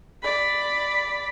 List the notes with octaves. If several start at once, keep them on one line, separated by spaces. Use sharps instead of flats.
D5 B5